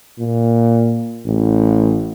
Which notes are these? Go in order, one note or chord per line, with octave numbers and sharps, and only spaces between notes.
A#2
A1